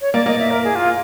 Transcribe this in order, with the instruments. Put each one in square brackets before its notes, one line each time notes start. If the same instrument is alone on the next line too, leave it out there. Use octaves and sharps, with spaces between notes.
[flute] C#5
[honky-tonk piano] A#3 [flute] D5
[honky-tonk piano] A#3 [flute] D#5
[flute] E5
A#4
G#4
F4